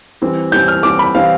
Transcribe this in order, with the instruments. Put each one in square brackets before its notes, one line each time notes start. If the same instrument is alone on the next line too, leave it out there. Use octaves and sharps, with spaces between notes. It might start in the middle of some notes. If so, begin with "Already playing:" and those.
[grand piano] E3 G3 C4
E3 G3 C4 G6
F6
E3 G3 C4 D6
B5
E3 G3 C4 F5